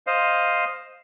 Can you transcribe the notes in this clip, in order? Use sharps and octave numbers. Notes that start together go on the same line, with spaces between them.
C5 D#5 F5